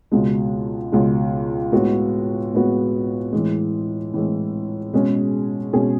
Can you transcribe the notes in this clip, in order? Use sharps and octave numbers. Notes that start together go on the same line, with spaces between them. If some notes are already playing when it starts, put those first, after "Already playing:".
C#2 B2 G#3
C#2 B2 G#3
A2 G#3 B3 F#4
A2 G#3 B3 F#4
A2 E3 G#3
A2 E3 G#3
B2 G#3 C#4 G#4
B2 G#3 C#4 G#4